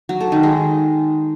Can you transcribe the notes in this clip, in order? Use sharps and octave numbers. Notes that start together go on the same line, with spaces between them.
F#3
A4
D#3
G#3